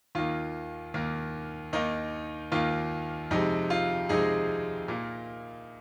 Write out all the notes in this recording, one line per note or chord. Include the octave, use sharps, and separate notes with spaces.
D#2 D#3 A#3 F4
D#2 D#3 A#3
D#2 D#3 A#3 D#4
D#2 D#3 A#3 F4
F2 C3 G#3 D#4
F4
F2 C3 G#3 D#4 G#4
A#2 A#3